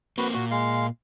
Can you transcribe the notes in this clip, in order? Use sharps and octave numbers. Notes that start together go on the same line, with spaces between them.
A#3 C4 F#4 B4
A#2 F#4
G#3 F5